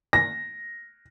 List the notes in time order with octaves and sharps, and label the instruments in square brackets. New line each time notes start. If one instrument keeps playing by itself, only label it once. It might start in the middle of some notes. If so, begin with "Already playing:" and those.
[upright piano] A#6